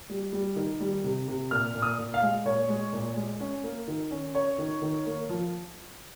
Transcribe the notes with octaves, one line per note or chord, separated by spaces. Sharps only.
G3
G3
D#3
G3
C3
C3
A#2 F6
A#2
D#6
A#2
F5
G#3
A#2 C#5
G#3
A#2
G#3
C#4
A#3
D#3
C#4
C#4 C#5
D#3
D#3
A#3
F3